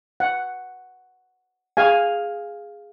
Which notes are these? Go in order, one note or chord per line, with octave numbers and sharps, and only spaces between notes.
F#5
G#4 F5 G#5